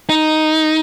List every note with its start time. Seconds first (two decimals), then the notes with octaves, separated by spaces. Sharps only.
0.09 D#4